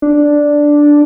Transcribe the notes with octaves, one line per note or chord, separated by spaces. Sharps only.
D4